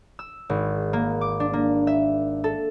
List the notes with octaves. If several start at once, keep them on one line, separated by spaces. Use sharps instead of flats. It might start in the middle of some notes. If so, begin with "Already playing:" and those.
E6
G#1
A#3
D6
D4
A#3
E5
A4